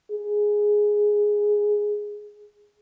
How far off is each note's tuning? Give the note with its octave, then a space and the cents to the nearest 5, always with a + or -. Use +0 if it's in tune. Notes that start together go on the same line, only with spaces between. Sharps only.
G#4 +0